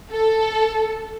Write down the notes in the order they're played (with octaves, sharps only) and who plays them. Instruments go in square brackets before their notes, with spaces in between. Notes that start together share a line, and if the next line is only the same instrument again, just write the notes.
[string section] A4